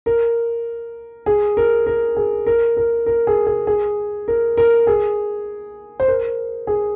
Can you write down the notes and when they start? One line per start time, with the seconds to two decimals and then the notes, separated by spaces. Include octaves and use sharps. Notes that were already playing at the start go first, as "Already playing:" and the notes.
0.06 A#4
1.26 G#4
1.57 A#4
1.87 A#4
2.17 G#4
2.46 A#4
2.77 A#4
3.06 A#4
3.27 G#4
3.47 G#4
3.67 G#4
4.28 A#4
4.57 A#4
4.87 G#4
6.00 C5
6.08 A#4
6.67 G#4